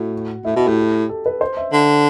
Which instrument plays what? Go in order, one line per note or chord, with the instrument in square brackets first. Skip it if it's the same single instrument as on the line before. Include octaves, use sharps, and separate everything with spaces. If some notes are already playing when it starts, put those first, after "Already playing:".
Already playing: [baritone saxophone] A2 [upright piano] F#4
[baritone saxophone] A2 [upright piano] E4
[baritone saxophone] B2 [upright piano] F#4
[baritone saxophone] A2 [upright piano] G4
[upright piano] A4
B4
C5
E5
[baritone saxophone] D3